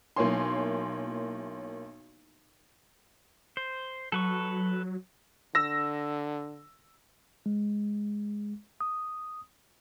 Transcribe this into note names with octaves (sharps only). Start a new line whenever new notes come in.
B1 A#3 E4 C#5 G#5 C6
C5
F#3 A4 B4 C#6
D3 E6 A#6
G#3
D#6